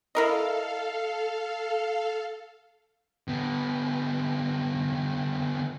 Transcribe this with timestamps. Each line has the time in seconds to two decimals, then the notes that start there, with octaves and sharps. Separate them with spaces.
0.15 E4 A4 A#4 D#5 F5
3.28 D3 B3